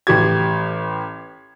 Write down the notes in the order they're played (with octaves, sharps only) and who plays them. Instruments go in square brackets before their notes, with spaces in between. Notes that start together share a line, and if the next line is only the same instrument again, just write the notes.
[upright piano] A1 G4 G#6